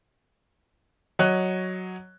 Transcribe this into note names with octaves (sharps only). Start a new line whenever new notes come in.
F#3 C#5 D#5 F#6